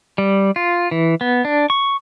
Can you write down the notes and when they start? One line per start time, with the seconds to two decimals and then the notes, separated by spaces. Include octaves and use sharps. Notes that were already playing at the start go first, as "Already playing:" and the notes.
0.18 G3
0.56 F4
0.91 E3
1.21 B3
1.45 D4
1.70 C#6